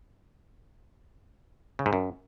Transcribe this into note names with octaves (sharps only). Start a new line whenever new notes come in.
C#3
G#2
F#2